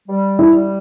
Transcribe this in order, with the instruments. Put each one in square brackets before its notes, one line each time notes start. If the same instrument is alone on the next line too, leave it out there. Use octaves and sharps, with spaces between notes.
[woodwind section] G3
[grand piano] E4
[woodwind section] G3